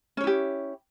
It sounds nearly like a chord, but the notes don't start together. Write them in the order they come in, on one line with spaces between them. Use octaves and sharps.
C#4 C#5 E4 G4